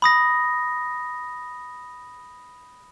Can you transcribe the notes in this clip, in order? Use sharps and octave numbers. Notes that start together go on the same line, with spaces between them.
B5 D#6 A#6